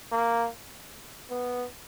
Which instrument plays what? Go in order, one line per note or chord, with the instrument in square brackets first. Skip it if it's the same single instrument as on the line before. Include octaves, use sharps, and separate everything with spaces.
[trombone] A#3
B3